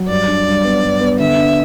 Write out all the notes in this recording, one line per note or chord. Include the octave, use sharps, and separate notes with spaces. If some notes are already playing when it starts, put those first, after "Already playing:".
Already playing: F#3
G2 D5
D4
G2
B3
G2
B3
D3 E5
D4